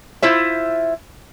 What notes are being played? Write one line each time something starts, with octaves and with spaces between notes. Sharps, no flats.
E4 F4 C5 E5